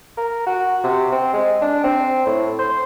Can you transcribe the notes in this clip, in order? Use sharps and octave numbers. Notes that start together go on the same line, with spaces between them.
A#4
F#4
C3
C4
G#3
D4
C4
A2
C5